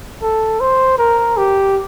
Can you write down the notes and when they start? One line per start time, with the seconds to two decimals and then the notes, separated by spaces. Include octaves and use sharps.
0.22 A4
0.60 C5
0.98 A#4
1.37 G4